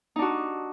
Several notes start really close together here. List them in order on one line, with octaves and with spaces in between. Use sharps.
D#4 D4 F#4